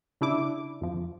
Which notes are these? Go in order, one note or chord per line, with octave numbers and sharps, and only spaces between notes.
C#3 D4 E4 D6
F2 F3